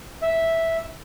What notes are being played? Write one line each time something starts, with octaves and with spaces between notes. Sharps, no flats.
E5